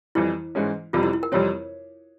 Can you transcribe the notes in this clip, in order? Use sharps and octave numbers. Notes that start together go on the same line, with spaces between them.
F2 E3 G3 E4
G#2 E3 G#3 C#4
F1 F2 C3 G3 F4
E4
E4
A#4
F2 C3 G3 C4 C#5